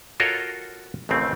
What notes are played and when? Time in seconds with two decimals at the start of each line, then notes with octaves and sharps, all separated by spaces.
0.20 F4 F#4 A4 A#4 C#5 D#5
1.09 A1 D#2 C#3 A3 C4